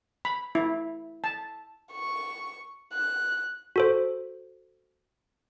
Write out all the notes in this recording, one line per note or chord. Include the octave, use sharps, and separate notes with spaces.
B5
E4
A5
C#6
F#6
F#4 A4 C5